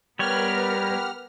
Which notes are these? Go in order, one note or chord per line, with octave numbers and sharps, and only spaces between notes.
G3 B3 G4 A#4 B4 C#5 F#5 F6